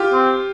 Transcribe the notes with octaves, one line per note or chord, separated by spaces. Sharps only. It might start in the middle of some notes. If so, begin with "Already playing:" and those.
Already playing: F4 G4
C4